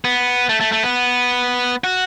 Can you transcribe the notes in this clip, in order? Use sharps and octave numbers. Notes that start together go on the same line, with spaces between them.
B3
A3
A3
A3
B3
F#4